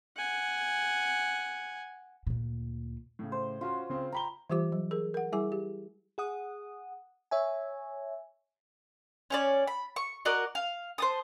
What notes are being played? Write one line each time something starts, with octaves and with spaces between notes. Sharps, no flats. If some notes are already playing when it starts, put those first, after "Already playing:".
F#5 G#5
D2 A#2
A2 C#3
C5
C#4 F4 F#4 C6
C#3 C4
G5 A#5 B5 G7
E3 G3 F4 G4 C5 D6
F#3
G#4 A#4
A#4 F#5
G3 E4 G#4 G#5 D6
G4
G#4 F#5 D#6
C#5 E5 G#5
C#4 C#5 D5
B5
C#6
F#4 A#4 D5 D#5
F5
C5 A5 D#6